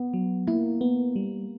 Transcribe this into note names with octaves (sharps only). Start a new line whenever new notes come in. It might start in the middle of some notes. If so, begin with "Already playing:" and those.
Already playing: B3
F#3
A#3 E4
B3
G3